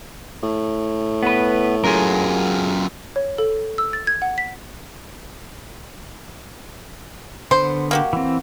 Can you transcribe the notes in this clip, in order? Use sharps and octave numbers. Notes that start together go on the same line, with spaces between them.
A2
B3 B4
F#2 F4 G#4 A#4
C#5
A4
E6
A6
G#6
F#5
B6
D3 B3 C5 C6
A#3 F#4 G4
E3 C4